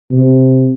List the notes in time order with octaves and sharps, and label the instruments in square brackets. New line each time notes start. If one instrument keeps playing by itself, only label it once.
[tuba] C3